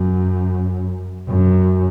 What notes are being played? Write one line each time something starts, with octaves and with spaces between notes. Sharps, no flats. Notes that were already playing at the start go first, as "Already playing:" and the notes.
Already playing: F#2
F#2